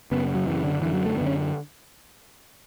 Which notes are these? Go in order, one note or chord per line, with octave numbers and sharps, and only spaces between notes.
F#2 C#3 B3
F#3
F#2 C#3 E3
D3
F#2 D3 E3
F#3
A3
F#2 D3 B3 C#4